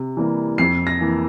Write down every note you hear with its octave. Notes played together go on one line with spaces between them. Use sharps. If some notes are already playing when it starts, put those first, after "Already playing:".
Already playing: C3
E3 G3 A#3
F2 C7
A#6
E3 A#3